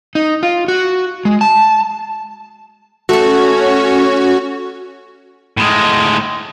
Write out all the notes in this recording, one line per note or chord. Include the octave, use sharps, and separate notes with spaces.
D#4
F4
F#4
G#3
A5
A3 C#4 F#4 A4 C#5
A2 G#3